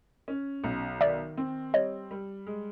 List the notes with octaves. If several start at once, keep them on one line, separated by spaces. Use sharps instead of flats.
C#4
B1
D#3 D5 E5
C4
G3 C#5 D#5
G3
G#3